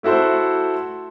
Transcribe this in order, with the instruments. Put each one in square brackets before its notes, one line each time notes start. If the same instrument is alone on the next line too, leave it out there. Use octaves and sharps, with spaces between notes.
[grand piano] A3 E4 F#4 A4 C5